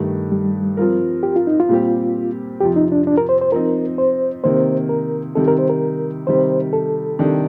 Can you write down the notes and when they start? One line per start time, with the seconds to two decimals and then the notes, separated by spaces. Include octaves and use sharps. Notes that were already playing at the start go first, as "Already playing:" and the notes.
Already playing: G2 D#3 A3
0.32 G3
0.77 F3 C4 F4 A#4
1.23 G4
1.36 F4
1.47 D#4
1.60 F4
1.69 A#2 G3 C4 G4
2.61 F2 C3 F3 G4
2.76 D#4
2.92 D4
3.07 D4
3.18 A#4
3.29 C5
3.41 C5
3.52 F3 C4 D#4 A#4
3.98 C5
4.44 C3 D#3 A#3 C5
4.89 A#4
5.35 C3 D#3 G3 A4
5.48 A#4
5.58 C5
5.70 A#4
6.27 C3 D#3 G3 C5
6.73 A4
7.19 C3 D#3 G3 D4 G4